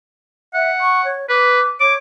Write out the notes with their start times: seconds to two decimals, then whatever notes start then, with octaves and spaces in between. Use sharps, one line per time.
0.54 E5 F#5
0.81 C#6
1.05 C#5
1.30 B4 D6
1.81 C#5 D6